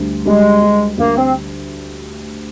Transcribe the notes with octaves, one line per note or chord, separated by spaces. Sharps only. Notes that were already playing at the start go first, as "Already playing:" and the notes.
Already playing: D2 G3
G3 G#3
G3
D2 A#3
C4